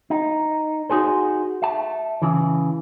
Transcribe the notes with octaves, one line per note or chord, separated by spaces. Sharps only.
D#4
D#4 F#4 G#4 C5
E5 A5
C#3 E3